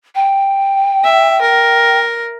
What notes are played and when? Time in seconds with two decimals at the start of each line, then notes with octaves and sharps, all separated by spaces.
0.15 G5
1.04 E5
1.42 A#4